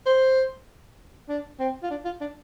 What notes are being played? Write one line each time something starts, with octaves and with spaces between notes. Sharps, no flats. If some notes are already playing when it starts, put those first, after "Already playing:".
C5
D4
C4
F4
D4
F4
D4